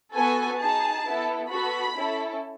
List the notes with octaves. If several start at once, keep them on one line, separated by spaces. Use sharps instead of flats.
B3 F#4 A4 G#5
D#4 G#4 A5
B3 E4 A4
B3 F#4 A4 B5
C#4 E4 A4